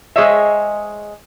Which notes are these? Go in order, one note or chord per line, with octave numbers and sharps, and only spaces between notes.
G#3 G#4 C5 C#5 D#5 E5